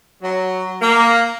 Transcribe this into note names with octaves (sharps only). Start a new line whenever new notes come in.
F#3
A#3